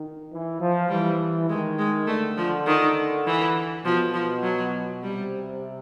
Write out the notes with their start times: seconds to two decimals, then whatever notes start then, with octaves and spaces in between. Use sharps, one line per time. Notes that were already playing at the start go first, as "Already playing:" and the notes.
Already playing: D#3
0.31 E3
0.61 F3
0.89 E3 G3
1.49 D#3 G#3
1.79 G#3
2.07 D3 A3
2.37 F3
2.67 D#3
3.26 E3
3.85 B2 F3
4.14 F3
4.43 F#3
5.03 C3 G3